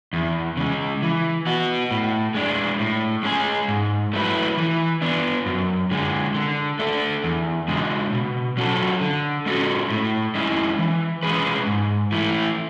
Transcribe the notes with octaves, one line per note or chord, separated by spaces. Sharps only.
E2
C#3 G#3
E3
B3 F#4
A2
G#3 D4
A2
G#3 C#4 G#4
G#2
F#3 A3 E4 B4
E3
B3 D4
F#2
D3 G#3
D3
A3 D4 A4
E2
C#3 G#3 D4
B2
F#3 C#4 F#4 A4
D3
G#3 C#4 F#4 A4
A2
G#3 C#4 E4
E3
G#3 C#4 G#4 B4
G#2
E3 A3 E4